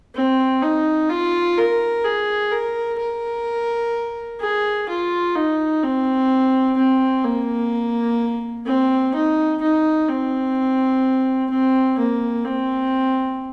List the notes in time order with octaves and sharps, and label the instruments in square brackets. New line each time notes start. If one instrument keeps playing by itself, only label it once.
[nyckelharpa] C4
D#4
F4
A#4
G#4
A#4
A#4
G#4
F4
D#4
C4
C4
A#3
C4
D#4
D#4
C4
C4
A#3
C4